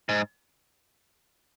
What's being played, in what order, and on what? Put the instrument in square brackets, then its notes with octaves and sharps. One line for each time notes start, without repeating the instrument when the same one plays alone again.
[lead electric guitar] G#2